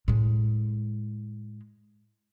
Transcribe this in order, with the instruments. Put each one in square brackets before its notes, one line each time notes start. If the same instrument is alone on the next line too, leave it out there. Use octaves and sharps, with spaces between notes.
[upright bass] A2 G#3